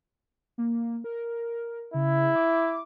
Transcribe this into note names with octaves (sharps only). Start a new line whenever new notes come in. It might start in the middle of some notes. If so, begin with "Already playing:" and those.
A#3
A#4
C#3 E4
D6